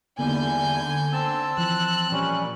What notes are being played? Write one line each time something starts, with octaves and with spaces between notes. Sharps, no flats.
E2 D3 G3 A#3 B3 D#4 G#5 G6
C4 A5 E6
E3 F3 F#6
A#2 G3 C#4